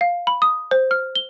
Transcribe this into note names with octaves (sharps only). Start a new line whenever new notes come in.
F5
B5
D#6
C5
F6
G7